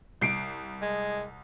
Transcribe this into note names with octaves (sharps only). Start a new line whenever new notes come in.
C2 C7 D7
G#3